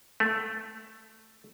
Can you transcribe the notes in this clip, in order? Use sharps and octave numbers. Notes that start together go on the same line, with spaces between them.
A3